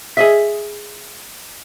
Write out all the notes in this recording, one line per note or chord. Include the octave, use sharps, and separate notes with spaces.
G#4 D#5 E5